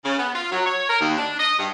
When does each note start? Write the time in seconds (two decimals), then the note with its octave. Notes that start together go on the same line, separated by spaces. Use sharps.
0.05 C#3
0.18 B3
0.35 F4
0.51 F#3
0.66 C#5
0.89 A#4
1.01 D#2
1.18 D4
1.40 D#5
1.59 G2